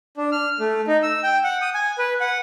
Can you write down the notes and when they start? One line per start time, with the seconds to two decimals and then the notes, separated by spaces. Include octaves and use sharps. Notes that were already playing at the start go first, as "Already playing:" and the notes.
0.17 D4
0.32 F6
0.60 A3
0.87 D#4
1.03 E6
1.23 G5
1.44 F#5
1.62 D#6
1.74 G#5
1.98 B4
2.20 F#5